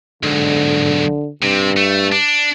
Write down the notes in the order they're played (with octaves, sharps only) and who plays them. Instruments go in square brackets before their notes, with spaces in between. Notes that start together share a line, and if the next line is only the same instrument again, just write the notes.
[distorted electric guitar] B1 G#2 [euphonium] D3
[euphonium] G2 [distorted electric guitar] C3
[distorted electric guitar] A3
D4